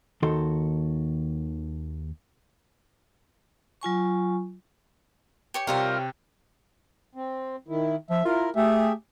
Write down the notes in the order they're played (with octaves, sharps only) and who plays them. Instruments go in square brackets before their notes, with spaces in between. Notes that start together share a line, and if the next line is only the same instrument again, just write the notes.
[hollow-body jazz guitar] D#2 D#3 F#4 A4 C6
[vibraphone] F#3 F4 G#5 C#6
[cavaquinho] G4 C#5 C#6
[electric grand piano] C3 G5 [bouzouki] G3 F4 A#4
[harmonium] C4
D#3 E4
[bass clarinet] F3 [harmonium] E5
[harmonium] E4 A#4 [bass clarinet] F4
[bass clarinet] A3 [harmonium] G4 G#4 E5